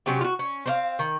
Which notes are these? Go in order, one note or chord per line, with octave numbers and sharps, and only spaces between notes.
C3 F#3 C#4 G4
F4 F#4
C#4
C4 D4 F5
D#3